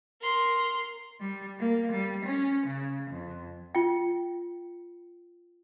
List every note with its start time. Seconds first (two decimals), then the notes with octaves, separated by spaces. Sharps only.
0.21 A#4 C6
1.20 G3
1.60 A#3
1.91 G3
2.24 C#4
2.66 C#3
3.10 F2
3.75 F4 G5